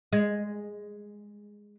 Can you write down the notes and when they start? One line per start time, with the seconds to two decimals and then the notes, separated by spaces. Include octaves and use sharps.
0.13 G#3